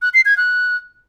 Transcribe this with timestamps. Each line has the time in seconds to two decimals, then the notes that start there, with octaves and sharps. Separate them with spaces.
0.02 F#6
0.14 C7
0.26 G#6
0.37 F#6